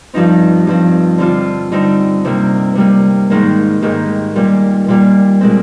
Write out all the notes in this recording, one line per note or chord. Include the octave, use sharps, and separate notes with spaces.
G2 F3 C4 D#4
G2 F3 C4
D3 G3 C4 F4
D3 G3 C4 D#4
C3 G3 A#3
C3 G3 A#3
G#2 D#3 A#3
G#2 D#3 A#3 G4
A#2 G3 A#3
A#2 G3 A#3
A#2 G#3 C4